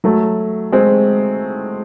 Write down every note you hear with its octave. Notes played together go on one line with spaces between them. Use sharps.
F#3 A3
G#3 C4